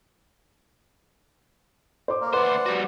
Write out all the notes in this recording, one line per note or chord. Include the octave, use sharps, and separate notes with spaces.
C5 D6
A#3
D2 B4 C5 D5 F#5
G3 F#4